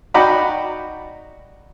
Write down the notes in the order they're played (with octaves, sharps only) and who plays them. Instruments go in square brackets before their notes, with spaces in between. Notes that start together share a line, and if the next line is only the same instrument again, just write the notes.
[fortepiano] D#4 F#4 D5 G5 A#5 B5